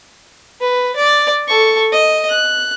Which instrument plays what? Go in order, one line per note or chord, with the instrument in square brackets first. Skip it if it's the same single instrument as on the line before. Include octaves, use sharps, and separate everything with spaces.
[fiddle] B4
D5
A4 C#6
D#5
F#6